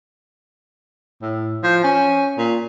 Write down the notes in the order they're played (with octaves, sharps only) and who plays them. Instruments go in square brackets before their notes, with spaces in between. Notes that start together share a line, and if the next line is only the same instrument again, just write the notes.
[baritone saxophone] A2
F3
C#4
A#2